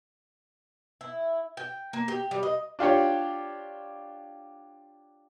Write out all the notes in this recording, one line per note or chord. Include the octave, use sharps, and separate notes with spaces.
E4
G5
A#3
G4
G3
D#5
D4 F4 G4 C#5